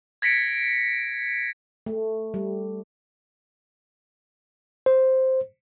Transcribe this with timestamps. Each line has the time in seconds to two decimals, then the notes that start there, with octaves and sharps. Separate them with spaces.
0.22 G#6 A#6 B6 C#7 D7
1.86 A3
2.34 G3
4.86 C5